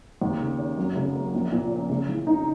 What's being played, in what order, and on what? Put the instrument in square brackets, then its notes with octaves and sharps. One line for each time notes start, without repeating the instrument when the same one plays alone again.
[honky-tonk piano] D#2
C#3
C#4
F#2
C#3
A#3
A#1
A#2
C#4
C#3
E3
D#4